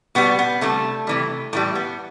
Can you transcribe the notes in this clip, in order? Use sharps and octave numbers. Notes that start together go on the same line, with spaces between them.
B2 G3 B3
B3
C3 E3 G3 A3
C3 E3 G3
A2 E3 G3 A3
B3